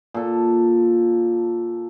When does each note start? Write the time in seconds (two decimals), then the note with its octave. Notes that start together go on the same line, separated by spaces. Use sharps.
0.14 A#2 A4